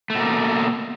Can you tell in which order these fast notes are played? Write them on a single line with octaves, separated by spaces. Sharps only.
A3 B2 A#3